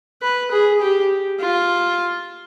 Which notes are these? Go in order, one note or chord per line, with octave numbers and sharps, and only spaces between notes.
B4
G#4
G4
F4